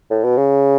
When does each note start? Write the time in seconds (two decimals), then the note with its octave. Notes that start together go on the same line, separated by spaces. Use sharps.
0.10 A2
0.24 B2
0.37 C#3